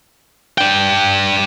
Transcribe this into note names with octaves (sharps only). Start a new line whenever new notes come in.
D4 G5